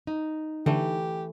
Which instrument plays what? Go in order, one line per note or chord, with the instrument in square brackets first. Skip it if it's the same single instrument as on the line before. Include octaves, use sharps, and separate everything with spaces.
[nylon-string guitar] D#4
[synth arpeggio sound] D3 [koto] E3 A3 [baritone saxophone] G4